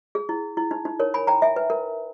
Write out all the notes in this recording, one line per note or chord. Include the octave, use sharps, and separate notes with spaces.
G#4
E4
E4
D#4
D#4
A#4 C#5
G#5 B5
G5 A#5
E5 G#5
B4
A#4